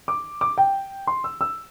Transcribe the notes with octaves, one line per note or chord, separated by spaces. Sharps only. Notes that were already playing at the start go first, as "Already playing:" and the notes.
D6
D6
G5
C6
E6
E6